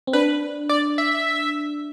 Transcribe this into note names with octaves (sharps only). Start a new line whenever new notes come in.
C4
D4 B4
D5
E5